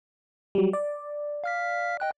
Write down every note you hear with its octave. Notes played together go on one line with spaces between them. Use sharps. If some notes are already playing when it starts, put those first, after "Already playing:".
F#3 G3
D5
F5 F6 B6
D#5 G5 F#6